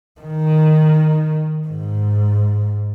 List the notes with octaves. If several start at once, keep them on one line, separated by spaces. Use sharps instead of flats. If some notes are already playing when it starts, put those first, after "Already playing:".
D#3
G#2